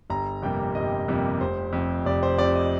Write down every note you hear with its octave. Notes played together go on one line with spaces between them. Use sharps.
G1 A#5
F2 C3 G3 A#3 G5
G1 D#5
F2 C3 G3 A#3
F1 C5
F2 C3
F1 D5
C5
F2 C3 D5
D#5